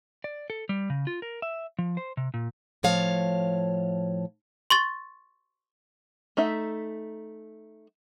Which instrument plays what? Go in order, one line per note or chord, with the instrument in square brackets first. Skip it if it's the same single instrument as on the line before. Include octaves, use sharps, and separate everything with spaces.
[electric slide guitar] D5
A4
G3
C#3
F4
A#4
E5
F3
C5
C3
A#2
[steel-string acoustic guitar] A2 F3 C#5 F5 A5
[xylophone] C6 C#6 A6
[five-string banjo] A3 D#4 E5